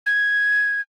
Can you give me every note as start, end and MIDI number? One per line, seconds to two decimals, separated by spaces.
0.06 0.81 92